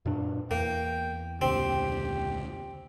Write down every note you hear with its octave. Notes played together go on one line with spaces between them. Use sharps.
F#2 A#2 D4
E2 A#3 G5
C#2 A#2 D3 C4 G4